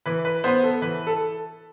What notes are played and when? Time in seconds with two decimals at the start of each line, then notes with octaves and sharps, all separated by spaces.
0.06 E3 B4
0.25 B4
0.44 B3 C5
0.63 A4
0.82 E3 B4
1.07 A4